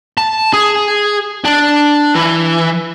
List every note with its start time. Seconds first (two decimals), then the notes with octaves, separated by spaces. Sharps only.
0.17 A5
0.53 G#4
1.44 D4
2.15 E3